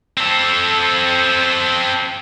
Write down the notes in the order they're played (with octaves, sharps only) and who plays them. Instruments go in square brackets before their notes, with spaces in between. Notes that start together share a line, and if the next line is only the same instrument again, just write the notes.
[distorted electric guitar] C4 A4